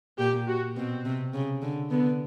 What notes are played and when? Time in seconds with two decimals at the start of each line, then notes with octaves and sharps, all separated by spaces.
0.19 A#2 G4
0.47 F#4
0.76 B2 C4
1.05 C3
1.34 C#3
1.62 D3
1.90 D3 B3